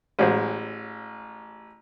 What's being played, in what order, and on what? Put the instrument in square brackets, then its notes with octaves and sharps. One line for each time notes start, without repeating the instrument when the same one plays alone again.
[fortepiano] A1 F#3 G#3 C5